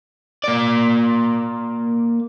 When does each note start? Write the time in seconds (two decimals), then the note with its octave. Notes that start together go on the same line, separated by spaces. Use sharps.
0.44 A#3 D5